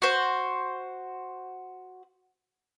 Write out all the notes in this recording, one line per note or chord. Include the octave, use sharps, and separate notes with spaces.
F#4 C5